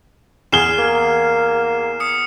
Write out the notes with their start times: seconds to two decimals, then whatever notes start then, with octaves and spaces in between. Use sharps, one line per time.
0.52 E2 G#4 F6 C7 E7 G7
0.79 A#3
2.00 D#6 C#7